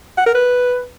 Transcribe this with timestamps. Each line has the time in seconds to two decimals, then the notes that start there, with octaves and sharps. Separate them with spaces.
0.18 F#5
0.26 A#4
0.35 B4